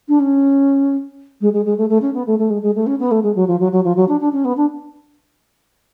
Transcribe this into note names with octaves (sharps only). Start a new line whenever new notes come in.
D4
C#4
G#3
G#3
G#3
A3
A3
C#4
B3
A3
A3
G#3
G#3
A3
C#4
B3
A3
G#3
F#3
F3
F#3
F#3
F3
F#3
D4
D4
C#4
B3
D4